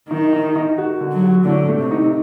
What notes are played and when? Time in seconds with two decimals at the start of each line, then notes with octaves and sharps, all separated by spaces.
0.10 D#3 D#4
0.33 D#4
0.56 D#4
0.78 F#4
1.01 D3
1.11 F#3
1.23 F#4
1.45 A2 D3
1.69 A3
1.79 C3
1.91 D#4